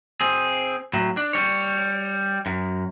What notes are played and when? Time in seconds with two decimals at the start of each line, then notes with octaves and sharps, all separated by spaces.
0.20 C4 G#4
0.93 A2 F#3
1.17 D4
1.33 G3 C#5
2.46 F#2